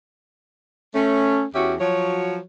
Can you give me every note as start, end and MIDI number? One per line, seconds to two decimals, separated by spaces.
0.95 1.44 57
0.95 1.44 61
1.54 1.75 40
1.54 1.75 61
1.54 1.75 66
1.54 1.75 67
1.54 1.75 76
1.80 2.39 53
1.80 2.39 54
1.80 2.39 66
1.80 2.39 73